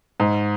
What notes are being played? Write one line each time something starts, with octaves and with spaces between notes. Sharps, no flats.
G#2